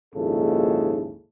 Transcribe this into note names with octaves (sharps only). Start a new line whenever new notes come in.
A#1 D#2 G#2 C#3 E4 A4